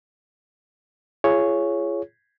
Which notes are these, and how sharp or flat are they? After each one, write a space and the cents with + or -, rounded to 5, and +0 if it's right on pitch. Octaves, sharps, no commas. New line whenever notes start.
F4 -40 G#4 +5 C#5 +0